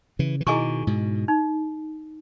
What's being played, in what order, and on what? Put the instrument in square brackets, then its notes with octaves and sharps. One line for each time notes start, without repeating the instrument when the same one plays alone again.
[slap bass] C#3 E3
E3
[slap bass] B2 D#3 [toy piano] E4 G#4 D#5 G#5 C#6
[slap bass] G#2 B2
[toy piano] D#4